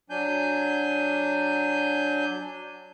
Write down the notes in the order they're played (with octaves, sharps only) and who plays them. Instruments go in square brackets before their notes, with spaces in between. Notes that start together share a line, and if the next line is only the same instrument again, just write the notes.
[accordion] F#3 D4 G#5 G6